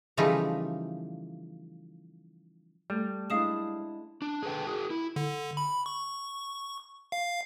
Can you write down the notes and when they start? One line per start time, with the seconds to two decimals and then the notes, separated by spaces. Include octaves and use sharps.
0.17 C#3 E3 F3 G3 A3 D#4
2.90 G3 A3
3.30 G#3 D4 E4 F5 D#6 E7
4.22 D4
4.43 G#4 A4 B4 G5
4.67 F#4 G#4 A#4
4.90 E4
5.16 D3
5.57 B5
5.86 C#6
7.12 F5